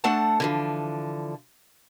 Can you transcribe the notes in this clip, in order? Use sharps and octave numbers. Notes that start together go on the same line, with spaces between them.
A3 D4 A4 F#5 A5
D3 E3 F3